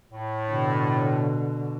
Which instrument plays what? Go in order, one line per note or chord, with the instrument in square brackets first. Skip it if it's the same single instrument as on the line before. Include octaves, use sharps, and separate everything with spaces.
[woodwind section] A2
[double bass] B2 D3